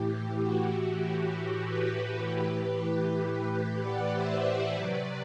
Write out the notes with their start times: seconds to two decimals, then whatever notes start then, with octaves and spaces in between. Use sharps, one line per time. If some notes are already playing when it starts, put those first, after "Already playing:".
Already playing: A2 E3 G4
0.12 G4
0.42 F#4
0.73 G4
1.04 G4
1.66 G4 B4
2.28 A2 E3
3.52 G4 B4
3.82 D5 F#5
4.14 C5 E5
4.75 C3 F#3 B4 D5